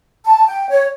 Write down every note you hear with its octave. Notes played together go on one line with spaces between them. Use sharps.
A5
G5
C#5